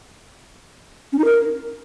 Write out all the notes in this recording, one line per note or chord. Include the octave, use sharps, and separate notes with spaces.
C#4
D#4
A#4